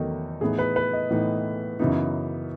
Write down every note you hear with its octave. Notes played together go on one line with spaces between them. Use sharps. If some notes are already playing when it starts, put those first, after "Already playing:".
Already playing: E2 D#3 F#3 A3 D#4
A2 E3 B3 D#4 G#4
B4
B4
D#5
A2 E3 B3 D#4
F#2 C#3 E3 B3 D#4